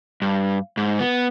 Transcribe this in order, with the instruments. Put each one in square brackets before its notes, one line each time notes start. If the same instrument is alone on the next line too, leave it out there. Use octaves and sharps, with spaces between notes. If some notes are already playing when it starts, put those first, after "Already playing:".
[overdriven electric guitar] G2
G#2
B3